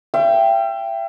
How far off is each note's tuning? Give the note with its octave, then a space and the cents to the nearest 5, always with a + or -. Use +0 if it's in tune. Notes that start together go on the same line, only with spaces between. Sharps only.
E5 +40 G5 +0